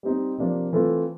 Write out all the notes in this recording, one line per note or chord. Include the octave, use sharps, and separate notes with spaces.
G3 C4 D#4
C3 F3 A#3 D4
E3 A3 C4 F4 A4